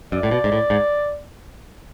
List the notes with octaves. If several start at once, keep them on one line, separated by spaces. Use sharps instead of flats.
F#2 D5
A2
B2
G#2
A2
G#2